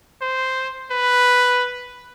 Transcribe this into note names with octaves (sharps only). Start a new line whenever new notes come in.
C5
B4